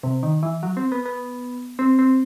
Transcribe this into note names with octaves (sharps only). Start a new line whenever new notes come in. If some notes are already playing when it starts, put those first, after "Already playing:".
C3
D#3
E3
F#3
C4
B3
B3
C4
C4